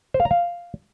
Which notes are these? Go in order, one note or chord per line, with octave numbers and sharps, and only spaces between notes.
C5
F5
A#5
F5